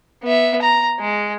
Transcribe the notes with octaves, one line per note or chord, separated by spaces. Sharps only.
B3 E5
A#5
G#3